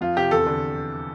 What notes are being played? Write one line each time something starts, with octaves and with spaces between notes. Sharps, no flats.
F2 F4
C3 G4
E2 A4
D3